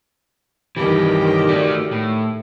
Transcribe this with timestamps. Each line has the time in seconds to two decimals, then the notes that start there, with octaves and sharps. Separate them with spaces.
0.77 G2 D#3 E3 G4
1.49 A3 F#4 D5
1.91 A2